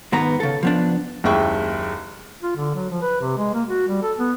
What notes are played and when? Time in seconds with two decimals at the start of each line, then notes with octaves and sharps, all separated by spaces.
0.12 G#2 D#3 B3 B4 A#5
0.40 C#3 A4
0.63 F3 B3 D4
1.24 F#1 D#2 G#3 E4 G5 C#6
2.43 F4
2.56 D3
2.74 F#3
2.90 F3
3.02 B4
3.21 C3
3.38 G#3
3.54 A#3
3.68 F#4
3.87 G3
4.02 A4
4.18 B3